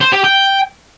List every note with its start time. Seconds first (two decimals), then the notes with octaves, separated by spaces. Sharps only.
0.01 C5
0.13 G4
0.24 G5